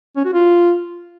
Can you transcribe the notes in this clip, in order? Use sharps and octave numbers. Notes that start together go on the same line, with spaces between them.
C#4
F#4
F4